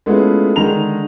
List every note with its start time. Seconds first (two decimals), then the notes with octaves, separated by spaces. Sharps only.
0.06 G#3 A3 B3 C#4 E4 F4
0.56 D3 D#3 G#3 G#4 A#5 F7